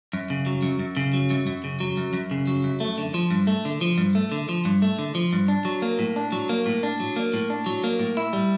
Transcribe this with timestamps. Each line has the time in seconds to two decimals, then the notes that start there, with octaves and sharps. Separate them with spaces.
0.13 F#2
0.30 C#3
0.46 F#3
0.62 F#2
0.79 F#2
0.97 C#3
1.13 F#3
1.30 F#2
1.47 F#2
1.64 C#3
1.80 F#3
1.97 F#2
2.13 F#2
2.31 C#3
2.47 F#3
2.64 F#2
2.80 A3
2.98 D3
3.14 F3
3.31 G2
3.47 A3
3.65 D3
3.81 F3
3.98 G2
4.15 A3
4.32 D3
4.49 F3
4.65 G2
4.82 A3
4.99 D3
5.15 F3
5.33 G2
5.48 D4
5.65 F#3
5.82 A#3
5.99 A2
6.16 D4
6.32 F#3
6.49 A#3
6.66 A2
6.83 D4
7.00 F#3
7.16 A#3
7.34 A2
7.50 D4
7.66 F#3
7.84 A#3
7.99 A2
8.17 E4
8.33 G3